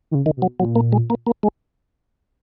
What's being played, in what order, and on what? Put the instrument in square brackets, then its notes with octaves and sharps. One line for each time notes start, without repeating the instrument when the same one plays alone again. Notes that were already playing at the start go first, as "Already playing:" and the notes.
[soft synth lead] D#3
C#3
[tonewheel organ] D#3
[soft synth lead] B2
[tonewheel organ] F#3
[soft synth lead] A#2 [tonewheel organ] F#3
[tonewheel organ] A#3
G#3
A#3
A#3
G#3